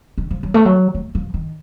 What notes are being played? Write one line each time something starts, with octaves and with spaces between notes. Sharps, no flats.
D#3
F3
F#3
A3
F#3
A3
F3
D#3